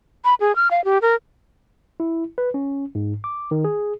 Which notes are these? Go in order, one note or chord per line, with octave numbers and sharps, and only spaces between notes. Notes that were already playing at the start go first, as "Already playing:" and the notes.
B5
G#4
F6
F5
G4
A#4
E4
B4
C#4
G#2
D6
D#3
G#4